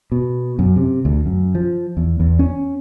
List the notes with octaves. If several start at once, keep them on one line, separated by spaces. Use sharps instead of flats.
B2
F#2
C3
D2
F#2
F3
E2
E2
C#4